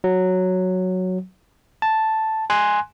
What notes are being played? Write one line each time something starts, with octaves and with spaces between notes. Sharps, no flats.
F#3
A5
G#5 C6 F#6